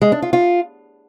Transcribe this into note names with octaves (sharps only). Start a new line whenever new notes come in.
G#3
D4
F4
F4